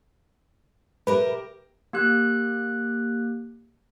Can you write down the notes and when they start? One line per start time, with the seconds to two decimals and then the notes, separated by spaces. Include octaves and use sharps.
1.07 G4 A#4 B4 E5
1.93 A#3 G4 F#6